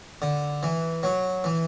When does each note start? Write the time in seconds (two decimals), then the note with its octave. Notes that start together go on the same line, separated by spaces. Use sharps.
0.22 D3
0.63 E3
1.03 F#3
1.44 E3